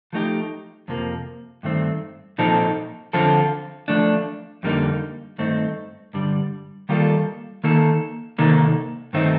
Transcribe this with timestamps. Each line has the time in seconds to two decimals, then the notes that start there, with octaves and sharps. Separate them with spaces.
0.13 F3 A3 D#4 G4
0.88 F2 C3 F3 A#3
1.63 G2 D#3 A3 C4
2.38 A#2 F3 C4 D#4 A4
3.13 D3 F3 C4 F4 A4
3.88 F3 A3 D4
4.63 F2 D3 G3 A#3 D#4
5.38 G2 D#3 A3 C4 D#4
6.13 G2 D3 G3
6.89 D#3 G3 A#3 F4 A4
7.64 D#3 A#3 D#4 A4
8.38 C3 D#3 A#3 D#4 A4
9.13 G2 D#3 A3 C4 D#4